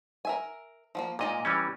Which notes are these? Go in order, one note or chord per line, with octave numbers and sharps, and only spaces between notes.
A#4 E5 G#5
F3 G3 A#3
A#2 G#3 D#4 A#4 D#5
E3 G3 C#4